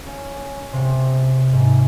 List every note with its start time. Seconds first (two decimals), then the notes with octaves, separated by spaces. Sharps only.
0.06 C#4
0.73 C3
1.53 G#2